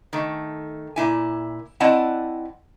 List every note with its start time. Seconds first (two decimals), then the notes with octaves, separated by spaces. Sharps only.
0.13 D#3 A3
0.96 A#2 E4 G#5
1.80 C4 E4 D5 D#5 F#5 A5